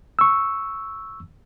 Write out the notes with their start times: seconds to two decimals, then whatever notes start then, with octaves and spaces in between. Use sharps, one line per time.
0.19 C#6 E6